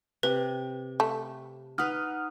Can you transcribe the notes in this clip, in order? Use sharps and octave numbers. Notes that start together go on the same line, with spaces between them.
C3 B4
A3
D#4 B4 F#5 D#6 F6